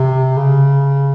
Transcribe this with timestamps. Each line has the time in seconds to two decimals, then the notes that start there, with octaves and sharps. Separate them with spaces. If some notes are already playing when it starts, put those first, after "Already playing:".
Already playing: C3
0.37 C#3